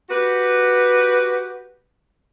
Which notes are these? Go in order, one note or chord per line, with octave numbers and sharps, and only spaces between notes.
F#4 G4 B4